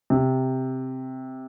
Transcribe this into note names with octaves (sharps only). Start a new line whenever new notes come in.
C3